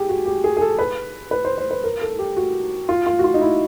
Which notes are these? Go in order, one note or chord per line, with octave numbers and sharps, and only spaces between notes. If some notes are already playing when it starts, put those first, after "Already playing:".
Already playing: G4 G#4
F#4
G4
G#4
G#4
A4
B4
B4
C5
C5
B4
A#4
A4
G4
F#4
F4
F4
F#4
F4
D#4
E4